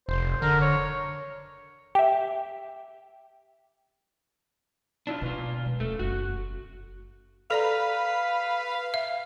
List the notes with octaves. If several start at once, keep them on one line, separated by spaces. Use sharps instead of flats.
F1 C5
D3 A#4
C#5
G4 E5
D4 E4 F4
B2 A#3 F4
G#3
D#1 A3
F#1 F#4
A4 B4 D5 F5 A#5
E5